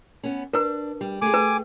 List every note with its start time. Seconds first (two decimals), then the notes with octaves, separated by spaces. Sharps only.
0.23 B3 C#4
0.53 D4 A#4 B4
1.01 G3
1.22 A3 G4 G#4 G#5 D6
1.34 B4